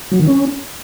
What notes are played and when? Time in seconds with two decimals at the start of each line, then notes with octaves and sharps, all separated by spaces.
0.11 F#3
0.19 D#3
0.27 C#4